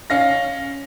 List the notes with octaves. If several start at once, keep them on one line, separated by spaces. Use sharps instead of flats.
C#4 F5 A#6